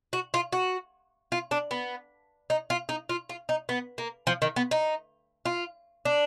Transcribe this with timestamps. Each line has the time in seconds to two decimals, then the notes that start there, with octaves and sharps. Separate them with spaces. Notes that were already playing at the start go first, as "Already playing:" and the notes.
0.13 F#4
0.34 F4
0.52 F#4
1.32 F4
1.51 D4
1.71 B3
2.50 D#4
2.70 F4
2.89 D#4
3.09 F4
3.29 F4
3.49 D#4
3.69 B3
3.98 A#3
4.27 F3
4.42 D#3
4.56 B3
4.71 D#4
5.45 F4
6.05 D4